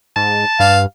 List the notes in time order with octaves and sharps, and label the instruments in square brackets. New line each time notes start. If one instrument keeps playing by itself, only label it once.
[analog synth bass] G#2 [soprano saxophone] A5
[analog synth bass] G2 [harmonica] F5